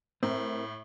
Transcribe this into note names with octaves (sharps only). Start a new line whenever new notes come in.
A2 C4 A#4